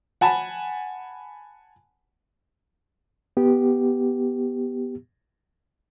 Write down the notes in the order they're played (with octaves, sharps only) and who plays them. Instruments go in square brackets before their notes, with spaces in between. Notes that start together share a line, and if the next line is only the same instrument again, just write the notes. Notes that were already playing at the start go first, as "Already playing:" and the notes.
[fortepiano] F#5 G#5 A5 B5
[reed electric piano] B3 G4